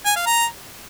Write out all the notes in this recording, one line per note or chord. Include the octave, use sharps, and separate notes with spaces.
G#5
F5
A#5